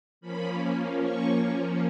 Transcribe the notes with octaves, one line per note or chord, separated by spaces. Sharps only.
F3 A#3 C#4 B5
C#6